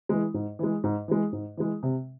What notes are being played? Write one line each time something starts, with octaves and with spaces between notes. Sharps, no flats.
E3 G#3
G#2
E3 G#3
G#2
E3 G#3
G#2
E3 G#3
C3